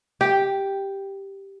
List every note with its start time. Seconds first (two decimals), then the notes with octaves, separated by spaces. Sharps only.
0.21 G4